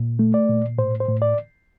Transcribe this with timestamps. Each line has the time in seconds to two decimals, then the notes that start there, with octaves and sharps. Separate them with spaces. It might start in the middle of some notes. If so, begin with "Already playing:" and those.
Already playing: A#2
0.19 A3
0.34 D5
0.49 A#2
0.78 A2 C5
1.00 C5
1.08 A2
1.22 D5